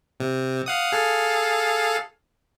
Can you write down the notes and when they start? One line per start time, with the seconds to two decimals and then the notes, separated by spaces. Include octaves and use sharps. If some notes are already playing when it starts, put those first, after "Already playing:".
0.20 C3
0.66 F5 F#5 D#6
0.92 G#4 A4 F5